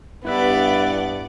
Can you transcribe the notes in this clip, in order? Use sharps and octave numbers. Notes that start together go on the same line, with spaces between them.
G2 B3 E4 B4 D5 E5